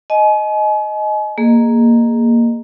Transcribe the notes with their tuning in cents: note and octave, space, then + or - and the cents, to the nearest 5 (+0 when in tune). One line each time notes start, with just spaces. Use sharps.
D#5 +0 G#5 +40
A#3 +0 G#4 +0 D#5 -20